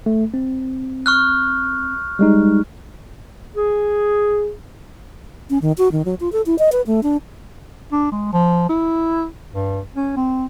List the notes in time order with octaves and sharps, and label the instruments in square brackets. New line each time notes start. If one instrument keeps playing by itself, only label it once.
[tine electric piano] A3
C4
[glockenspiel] C#6 F6 F#6
[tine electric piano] G3 G#3 D#4
[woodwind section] G#4
[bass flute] C#4
D#3
F#4
D#3
F#3
F4
A4
E4
D#5
B4
A3
D4
[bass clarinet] D4
G#3
F3
E4
G2
C#4
C4